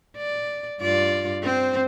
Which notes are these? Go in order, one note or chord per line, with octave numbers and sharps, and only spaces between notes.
D5
G2 F4 D5
C4 C5